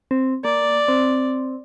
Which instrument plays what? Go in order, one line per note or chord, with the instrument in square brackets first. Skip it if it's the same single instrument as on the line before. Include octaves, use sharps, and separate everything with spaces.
[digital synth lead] C4
[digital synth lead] A#3 [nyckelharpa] D5
[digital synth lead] C4